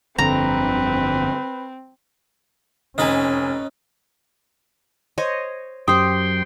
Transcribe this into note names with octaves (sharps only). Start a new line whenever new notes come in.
G1 F2 D3 C4 B4 A#5
F1 C#4 D#4 B4 G#5
C5 C#5 D#5
F#2 G4 C5 G5 C6 D#6